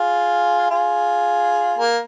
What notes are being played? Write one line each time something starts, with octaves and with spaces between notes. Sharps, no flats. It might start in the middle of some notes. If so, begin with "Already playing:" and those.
Already playing: F4 G#4
F4 G#4
A#3